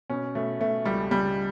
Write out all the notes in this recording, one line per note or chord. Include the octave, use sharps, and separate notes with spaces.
B2 C#4
B2 A3
B2 A3
C#2 G3
C#3 G3